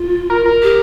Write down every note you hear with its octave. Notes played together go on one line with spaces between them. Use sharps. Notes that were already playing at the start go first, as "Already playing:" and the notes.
Already playing: F4
A#4
A#4
G4